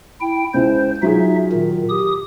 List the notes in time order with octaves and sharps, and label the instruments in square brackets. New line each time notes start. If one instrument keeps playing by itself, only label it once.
[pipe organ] E4 G5
[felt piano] C#2 E4 [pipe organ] C5
[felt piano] F#3 F4 G#4 [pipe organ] D#4 E5
[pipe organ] A#2 D#3
G4 D#6